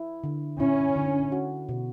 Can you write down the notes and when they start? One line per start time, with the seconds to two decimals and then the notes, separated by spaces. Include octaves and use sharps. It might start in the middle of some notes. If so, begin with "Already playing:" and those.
Already playing: E4
0.24 D3
0.60 C#4 E4
0.96 D3
1.32 F#4
1.69 B2